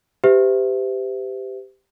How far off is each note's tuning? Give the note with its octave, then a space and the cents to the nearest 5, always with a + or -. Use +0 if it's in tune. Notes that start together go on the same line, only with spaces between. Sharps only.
G4 +0 C5 -45 E5 +0